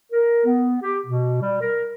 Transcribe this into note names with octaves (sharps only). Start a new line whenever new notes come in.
A#4
B3
G4
B2
G3
A#4